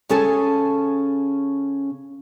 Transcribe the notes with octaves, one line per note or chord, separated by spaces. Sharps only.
C#3 C#4 G#4 A4 G#5 A5